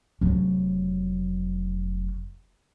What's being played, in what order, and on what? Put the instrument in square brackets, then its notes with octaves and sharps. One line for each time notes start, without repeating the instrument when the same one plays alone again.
[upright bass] F1 F#3